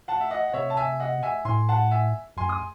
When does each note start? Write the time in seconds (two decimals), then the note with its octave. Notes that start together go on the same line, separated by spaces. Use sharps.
0.08 F#5 A5
0.20 E5
0.30 D#5 F#5
0.48 F#5
0.54 C3 C#5 E5
0.70 A5
0.77 E5 G#5
1.00 D#5 F#5
1.23 E5 G#5
1.45 A2 G#5 C6
1.69 F#5 A5
1.91 E5 G#5
2.37 F#2 G#5 C6
2.49 D#6